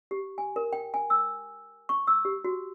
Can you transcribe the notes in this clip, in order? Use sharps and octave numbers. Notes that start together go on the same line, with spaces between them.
G4
G#5
A#4
G5
G#5
E6
C#6
E6
G4
F#4